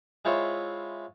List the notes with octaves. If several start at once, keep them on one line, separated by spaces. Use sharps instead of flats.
G#3 C4 E4 F4 C#5 E5